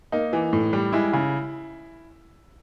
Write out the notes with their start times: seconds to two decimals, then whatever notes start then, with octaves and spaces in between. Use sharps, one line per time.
0.12 A#3 D#4
0.33 E3
0.53 A2
0.73 G3
0.93 G#3 E4
1.13 C#3